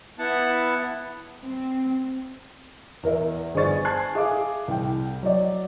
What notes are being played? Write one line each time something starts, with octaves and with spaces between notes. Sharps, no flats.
B3 E4 F#5 A5
C4
E2 A#4 E5
G1 G#4 C5 D5 C#6 A6
G#5 A5 F#6 G#6 C7
G#4 E5 F5 D6
C2 G5
F#3 D5